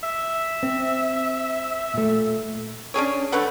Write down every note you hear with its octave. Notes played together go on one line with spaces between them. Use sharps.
E5
C4
A#2 A3
C#4 D4 G#4 C#5
D3 A3 B4 F#5